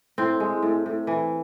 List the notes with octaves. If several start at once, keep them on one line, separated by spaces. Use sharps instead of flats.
A2 C4
G#3
A2
A2
E3